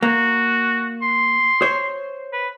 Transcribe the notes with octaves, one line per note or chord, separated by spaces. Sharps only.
A#3 F#4
C6
C5 C#5
B4